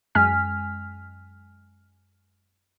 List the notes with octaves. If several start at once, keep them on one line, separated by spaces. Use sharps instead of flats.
F#2 G#3 G#5 F6 B6